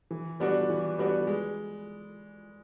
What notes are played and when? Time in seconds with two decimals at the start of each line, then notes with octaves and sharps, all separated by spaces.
0.11 E3
0.40 G3 B3 D4 F#4
0.69 E3
0.98 G3 B3 D4 F#4
1.27 G#3